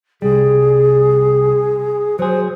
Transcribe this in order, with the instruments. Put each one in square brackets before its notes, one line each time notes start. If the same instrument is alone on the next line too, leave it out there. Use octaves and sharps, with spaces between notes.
[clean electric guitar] C2 G3 [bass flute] G#4
[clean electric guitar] F#3 G#4 [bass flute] C5